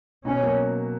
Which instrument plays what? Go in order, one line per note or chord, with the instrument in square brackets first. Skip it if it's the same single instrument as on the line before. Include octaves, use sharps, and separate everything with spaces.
[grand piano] B2 [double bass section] C#4
[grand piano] F#3 A#3